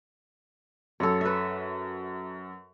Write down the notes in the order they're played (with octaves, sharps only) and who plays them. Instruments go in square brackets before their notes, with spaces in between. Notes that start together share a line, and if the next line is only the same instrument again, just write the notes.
[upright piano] F#2 [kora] A4 C#5
[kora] B4 E5